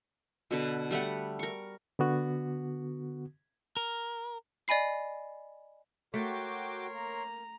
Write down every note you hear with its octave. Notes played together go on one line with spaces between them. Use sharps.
B2 D3 B4
G3 A3 B4 F#5
A#4 C#6
D3 B3 F#4
A#4
D5 D#5 G#5 B5 C7
A3 F#4 A#4 C#5 G5 C6 D6
A#3 A#5